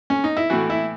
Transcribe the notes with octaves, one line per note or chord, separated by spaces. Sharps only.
C#4
D#4
E4
A2 E3 F#4
E4